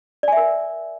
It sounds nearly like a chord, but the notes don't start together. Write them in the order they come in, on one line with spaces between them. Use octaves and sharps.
D5 G#5 E5 A#4